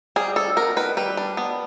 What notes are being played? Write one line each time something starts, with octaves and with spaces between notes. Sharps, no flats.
G3 G#4
D4 A4
B3 A#4
D#3 B4
G3 B4
D4
B3